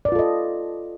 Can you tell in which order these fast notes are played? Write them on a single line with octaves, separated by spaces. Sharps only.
D5 B4 F4 A4 D#5